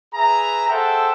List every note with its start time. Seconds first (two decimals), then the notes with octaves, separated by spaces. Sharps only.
0.15 G#4 B4 E5 A#5
0.69 G#4 A4 C5 E5 F#5 G5